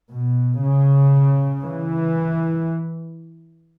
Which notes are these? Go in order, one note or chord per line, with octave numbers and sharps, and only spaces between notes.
B2
C#3
E3